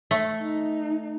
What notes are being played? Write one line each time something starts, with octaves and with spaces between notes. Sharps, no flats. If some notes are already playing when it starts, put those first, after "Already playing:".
A3
D#4